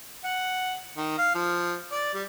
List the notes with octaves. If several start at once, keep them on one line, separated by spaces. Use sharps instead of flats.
F#5
D#3
F5
F3
D5
G3